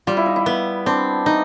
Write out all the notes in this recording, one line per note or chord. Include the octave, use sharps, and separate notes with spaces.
G3 F4
E4
D#4
E4
B3
C4 D4
D#4